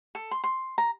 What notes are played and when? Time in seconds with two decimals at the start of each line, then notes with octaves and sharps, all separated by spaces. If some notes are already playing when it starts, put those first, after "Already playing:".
0.15 A4
0.31 C6
0.44 C6
0.78 A#5